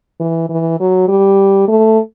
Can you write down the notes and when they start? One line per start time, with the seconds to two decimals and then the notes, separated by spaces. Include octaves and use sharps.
0.20 E3
0.50 E3
0.80 F#3
1.09 G3
1.68 A3